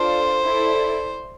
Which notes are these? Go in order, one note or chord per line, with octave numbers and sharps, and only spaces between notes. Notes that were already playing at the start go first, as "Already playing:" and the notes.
Already playing: D4 F4 A4 C5 D5 F5
E4 A4 D5